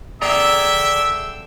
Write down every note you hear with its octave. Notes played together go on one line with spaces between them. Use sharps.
D3 G#4 D5 E5 G5 A#5 E6